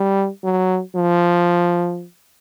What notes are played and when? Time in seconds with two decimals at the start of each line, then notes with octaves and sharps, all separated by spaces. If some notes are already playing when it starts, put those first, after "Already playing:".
Already playing: G3
0.44 F#3
0.96 F3